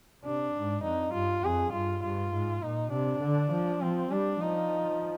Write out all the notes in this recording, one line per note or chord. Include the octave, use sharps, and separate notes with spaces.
C3 D4
G#2
F2 D#4
G2 F4
F2 G#4
G2 F4
G2 F4
G#2
A#2 D#4
C3 D4
D3
F3
F3 C4
G3 D4
F3 D#4